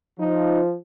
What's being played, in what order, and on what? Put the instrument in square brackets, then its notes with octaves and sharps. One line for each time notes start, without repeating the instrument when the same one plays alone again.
[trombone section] F3 [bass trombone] D#4